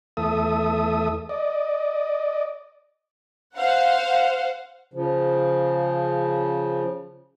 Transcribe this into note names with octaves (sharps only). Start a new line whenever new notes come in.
E2 A3 A4 E5 D#6
D5 D#5
C5 F5 F#5
C#3 F3